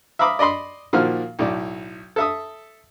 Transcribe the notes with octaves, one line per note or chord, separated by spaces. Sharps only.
E5 F5 A#5 B5 D6 D#6
D5 D#5 B5 C6 D6
A#2 D#3 F3 A#3 F#4 F6
B1 A2 D5
A4 E5 D#6